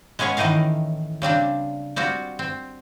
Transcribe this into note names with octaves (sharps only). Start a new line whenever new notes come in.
G#3 B3 C#4 G#4 C#5
A2 D#3 E3 D#4 A#4 F5
C#3 G3 C4 D4
G3 C4 F4 F#4
C4